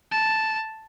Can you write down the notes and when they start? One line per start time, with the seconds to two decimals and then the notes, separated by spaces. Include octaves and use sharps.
0.11 A5